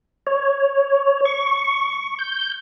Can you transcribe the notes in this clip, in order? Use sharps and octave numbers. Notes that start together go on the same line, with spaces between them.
C#5
C#6
G6